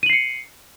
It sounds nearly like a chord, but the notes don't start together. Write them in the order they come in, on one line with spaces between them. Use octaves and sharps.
D#7 F#7 C7 C#7